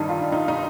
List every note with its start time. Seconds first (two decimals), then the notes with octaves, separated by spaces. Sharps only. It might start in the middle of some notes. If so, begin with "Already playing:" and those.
Already playing: G2 D#3 G3 D#4
0.09 F4
0.32 D#4
0.48 D#4